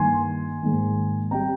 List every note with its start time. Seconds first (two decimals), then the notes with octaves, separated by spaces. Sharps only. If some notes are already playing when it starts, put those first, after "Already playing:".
Already playing: G2 D#3 A#3 G#5 C6
0.62 G#2 D#3 A#3
1.31 G3 C4 G5 A#5